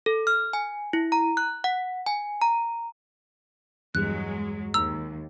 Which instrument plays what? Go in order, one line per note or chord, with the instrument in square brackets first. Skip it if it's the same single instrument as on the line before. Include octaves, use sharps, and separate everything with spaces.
[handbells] A4
F6
G#5
E4
A#5
F#6
F#5
G#5
A#5
[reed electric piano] E2 G2 [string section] F#3 G#3 [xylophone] F#6
[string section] D#2 [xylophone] A#5 E6